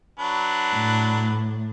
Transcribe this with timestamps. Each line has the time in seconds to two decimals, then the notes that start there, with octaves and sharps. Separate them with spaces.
0.19 F#3 D4 B4
0.76 A2